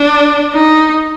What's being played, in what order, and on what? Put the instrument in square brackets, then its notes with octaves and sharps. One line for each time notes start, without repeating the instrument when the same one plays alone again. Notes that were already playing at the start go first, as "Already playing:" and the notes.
Already playing: [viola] D4
D#4